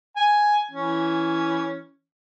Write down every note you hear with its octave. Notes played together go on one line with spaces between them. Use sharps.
G#5
E3 C#4